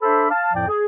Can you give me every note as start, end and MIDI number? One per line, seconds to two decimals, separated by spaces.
0.02 0.27 62
0.02 0.27 69
0.02 0.27 72
0.02 0.27 76
0.02 0.27 83
0.31 0.53 77
0.31 0.53 81
0.53 0.65 41
0.53 0.65 45
0.53 0.65 53
0.53 0.65 74
0.53 0.65 79
0.68 0.85 68